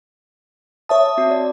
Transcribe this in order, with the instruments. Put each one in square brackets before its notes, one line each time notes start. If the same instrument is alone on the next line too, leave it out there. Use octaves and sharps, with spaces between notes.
[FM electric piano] C#5 E5 A5 [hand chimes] D#6
[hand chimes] C4 F#4
D5